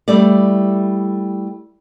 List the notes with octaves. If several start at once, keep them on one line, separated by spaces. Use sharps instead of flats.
G3 A3 E4 G4 D5